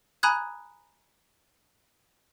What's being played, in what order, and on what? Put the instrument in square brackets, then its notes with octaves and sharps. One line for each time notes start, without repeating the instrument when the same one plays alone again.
[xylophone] G#5 A#5 B5 D#6 F#6 G#6